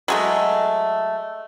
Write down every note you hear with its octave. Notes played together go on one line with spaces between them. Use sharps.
F#3 G#3 A3